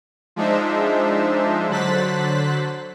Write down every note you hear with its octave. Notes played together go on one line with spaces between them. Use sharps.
F3 G#3 D4 D#4 C5 E5
D3 F#3 C5 F#6 A6 B6